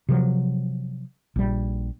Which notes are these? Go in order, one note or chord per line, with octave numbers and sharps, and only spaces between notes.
C3 F3 F#3
A#1 G3